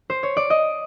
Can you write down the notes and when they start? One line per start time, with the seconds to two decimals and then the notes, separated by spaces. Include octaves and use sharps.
0.10 C5
0.23 C#5
0.37 D5
0.50 D#5